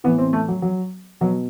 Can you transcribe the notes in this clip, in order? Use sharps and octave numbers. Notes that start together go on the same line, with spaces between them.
A2 E3 B3
C4
A3
F#3
F#3
B2 F#3